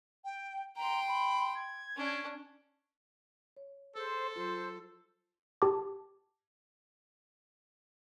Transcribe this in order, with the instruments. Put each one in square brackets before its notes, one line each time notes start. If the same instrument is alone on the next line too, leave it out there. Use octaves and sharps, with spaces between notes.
[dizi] G5
[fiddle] G5 C6 [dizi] A#5
[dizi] B5
G#6
[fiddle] C#4 D4
[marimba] C#5
[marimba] G#4 [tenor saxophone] A4 [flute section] C5
[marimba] F#3 F4 [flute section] C5
[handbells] G4 A5 D6